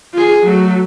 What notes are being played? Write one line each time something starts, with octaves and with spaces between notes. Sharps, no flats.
F4 G#4
F#3 A3